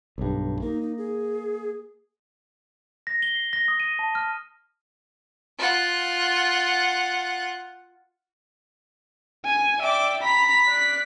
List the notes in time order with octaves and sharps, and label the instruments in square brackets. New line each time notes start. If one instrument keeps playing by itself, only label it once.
[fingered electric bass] B1 G2
[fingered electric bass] A#3 [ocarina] D#4
[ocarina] D#4
G#4
[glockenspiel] A#6
G7
C7
A#6
D#6
D#7
A5
F6
[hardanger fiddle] F4 F#5
[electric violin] G#5
[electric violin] D5 E5 [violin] G5 D6
[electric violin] A#5 B5 [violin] B6
[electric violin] D5 F#6